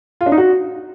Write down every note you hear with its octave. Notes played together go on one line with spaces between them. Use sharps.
F4
D4
D#4
F#4